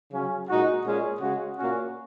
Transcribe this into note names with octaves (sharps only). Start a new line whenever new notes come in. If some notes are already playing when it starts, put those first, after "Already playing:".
C#3 F#3 C#4
A#2 G#3 D#4 F#4
A#2 G#3 C#4
C#3 G#3 F#4
A#2 A#3 C#4 F#4